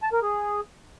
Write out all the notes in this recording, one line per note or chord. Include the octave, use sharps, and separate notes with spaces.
A5
A#4
G#4